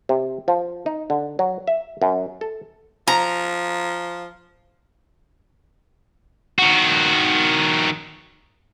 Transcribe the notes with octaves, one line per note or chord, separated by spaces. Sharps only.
C3
F3
D#4
D3
F#3
E5
F#2
A4
F3 A#5
D#3 F#4